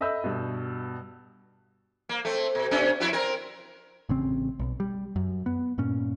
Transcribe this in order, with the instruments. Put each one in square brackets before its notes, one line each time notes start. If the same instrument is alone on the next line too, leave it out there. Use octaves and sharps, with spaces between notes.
[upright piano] A4 D#5 E5 B5 E6 G6
G2 B2
[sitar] A#3
A3 C4
B2
B2 C#4 D4
F2 E4 F#4
C4 A#4
[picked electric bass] A1 C#3 C4
B1
G3
F#2
B3
G2 A#2 C#4